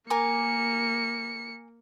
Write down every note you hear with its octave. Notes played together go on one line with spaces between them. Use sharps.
A#3 A#4 G#5 D6 C#7